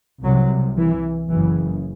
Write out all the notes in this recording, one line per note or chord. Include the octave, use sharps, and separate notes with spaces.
C2 C3 F#3
E3
F#1 F#2 C#3 E3